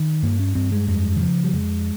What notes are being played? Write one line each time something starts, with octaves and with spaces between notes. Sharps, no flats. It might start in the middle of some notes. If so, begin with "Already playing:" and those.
Already playing: D#3
G2 A#3
C#4
G2 C4
G#3
F2 G#3
D#3
C#3 F3
G3
F2 G#3